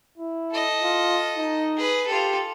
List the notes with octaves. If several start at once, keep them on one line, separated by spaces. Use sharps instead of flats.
E4
A4 D#5
F4
D#4
G#4 B4
F4 G4 A4